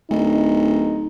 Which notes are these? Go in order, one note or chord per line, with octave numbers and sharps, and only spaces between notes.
D1 D#4